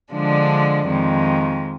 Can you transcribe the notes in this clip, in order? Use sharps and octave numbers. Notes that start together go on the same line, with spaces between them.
D3 F3 G#3 D4
F2 D#3 G#3